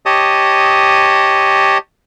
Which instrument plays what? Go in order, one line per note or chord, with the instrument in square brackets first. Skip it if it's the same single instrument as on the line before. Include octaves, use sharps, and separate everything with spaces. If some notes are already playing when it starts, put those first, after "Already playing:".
[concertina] G4 C#5 D#5 A5 D#6